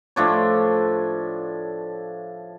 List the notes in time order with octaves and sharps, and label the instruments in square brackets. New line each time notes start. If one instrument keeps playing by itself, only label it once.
[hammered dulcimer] A2 F3 D4 C#5